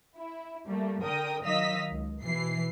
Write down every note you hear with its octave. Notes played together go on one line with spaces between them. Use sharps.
E4
G3 A3 A#3
D3 A#4 G5 D#6
D#3 F#3 D#5 F5 E6 B6
C#2
B2 E3 C7